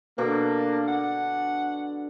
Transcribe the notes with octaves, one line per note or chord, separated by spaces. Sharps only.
B2 D3 A#3 D4
F#5